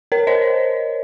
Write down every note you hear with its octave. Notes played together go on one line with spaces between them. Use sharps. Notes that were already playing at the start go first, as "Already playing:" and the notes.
A#4 C#5
C5 D#5